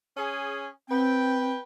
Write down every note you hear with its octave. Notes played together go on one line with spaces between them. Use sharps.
C#4 G#4
C4 B4 G5